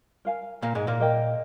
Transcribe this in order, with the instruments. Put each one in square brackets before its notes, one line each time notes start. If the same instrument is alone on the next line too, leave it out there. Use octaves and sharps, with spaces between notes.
[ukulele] A#4 F5 G#5
[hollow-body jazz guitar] A#2 A#3
G#2 G#3
A#2 A#3
[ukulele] A#4 D#5 G5